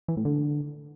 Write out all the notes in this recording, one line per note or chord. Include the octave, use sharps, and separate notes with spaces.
E3
A2
D3